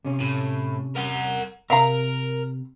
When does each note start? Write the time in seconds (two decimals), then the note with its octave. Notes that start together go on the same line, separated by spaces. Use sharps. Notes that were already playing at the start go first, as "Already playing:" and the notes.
0.05 C3 C#4
0.20 A2
0.95 A#4 F#5
1.70 C3 A#4 E5 F5 A#5